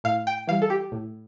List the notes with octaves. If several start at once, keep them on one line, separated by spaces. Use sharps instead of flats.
A2 F5
G5
E3 G3 F5
A4
G4
A2